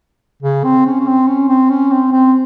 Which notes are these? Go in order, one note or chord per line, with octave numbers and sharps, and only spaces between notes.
C#3
C4
C#4
C#4
C4
C#4
C4
C#4
C4
C4